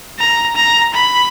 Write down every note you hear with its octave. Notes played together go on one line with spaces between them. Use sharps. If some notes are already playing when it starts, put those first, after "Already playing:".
A#5
A#5
B5